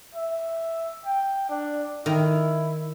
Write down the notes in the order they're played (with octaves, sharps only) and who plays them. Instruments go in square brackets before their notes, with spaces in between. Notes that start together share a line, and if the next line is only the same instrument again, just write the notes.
[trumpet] E5
G5
D4
[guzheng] D#3 [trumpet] E4